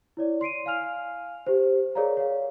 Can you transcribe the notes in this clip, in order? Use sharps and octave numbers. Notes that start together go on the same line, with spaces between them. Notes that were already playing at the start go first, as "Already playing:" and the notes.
E4 C#5 D5
C6 C7 D7 D#7
F5 G#5 F6 F7
G4 C5
G#4 A#4 C#5 D5 F5 A#5
C#5 F5